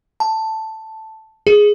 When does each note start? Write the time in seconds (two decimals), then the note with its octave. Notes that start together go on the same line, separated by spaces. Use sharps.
0.20 A5
1.47 G#4